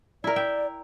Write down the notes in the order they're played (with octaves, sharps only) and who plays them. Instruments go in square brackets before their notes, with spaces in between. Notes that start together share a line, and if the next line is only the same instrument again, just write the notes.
[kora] E4 A#4 [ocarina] D5
[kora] E5 G5